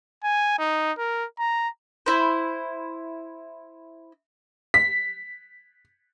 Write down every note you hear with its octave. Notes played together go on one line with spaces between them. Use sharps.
G#5
D#4
A#4
A#5
E4 C5
B6